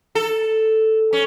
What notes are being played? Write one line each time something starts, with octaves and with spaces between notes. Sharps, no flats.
A4
C#4